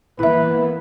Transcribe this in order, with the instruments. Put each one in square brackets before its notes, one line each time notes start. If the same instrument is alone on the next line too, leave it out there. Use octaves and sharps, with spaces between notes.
[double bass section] E3 A#3 B3 [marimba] E4 E5 [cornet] B4